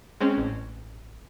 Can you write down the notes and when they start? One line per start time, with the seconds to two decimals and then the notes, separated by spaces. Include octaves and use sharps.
0.20 G#3 C4 C#4
0.38 A1